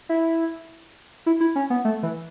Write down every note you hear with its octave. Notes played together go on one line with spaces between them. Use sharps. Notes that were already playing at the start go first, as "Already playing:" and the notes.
E4
E4
E4
C#4
B3
A3
E3